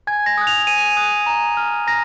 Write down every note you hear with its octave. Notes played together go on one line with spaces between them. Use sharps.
G#5 G#6
A#6
D#6 F#6
F7
G#5 D#7
D#6 F#6
A#5
F6
A#5 A#6